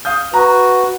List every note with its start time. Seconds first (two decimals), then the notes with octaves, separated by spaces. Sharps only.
0.05 F5 D#6 G6
0.34 F#4 B4 A#5